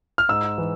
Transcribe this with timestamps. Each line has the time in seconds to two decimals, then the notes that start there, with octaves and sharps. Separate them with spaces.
0.18 F6
0.29 G#2 E6
0.58 E3